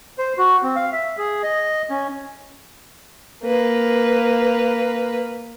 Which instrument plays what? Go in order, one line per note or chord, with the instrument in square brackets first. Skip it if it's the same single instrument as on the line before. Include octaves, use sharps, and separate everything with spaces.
[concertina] C5
F#4
C4
F5
E5
G#4
D#5
C#4
[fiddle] A#3 B4